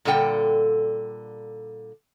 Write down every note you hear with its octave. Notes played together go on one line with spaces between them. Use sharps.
A#2 D3 G3 A4 F#5 G5